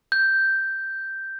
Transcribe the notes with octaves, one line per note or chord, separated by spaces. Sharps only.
G6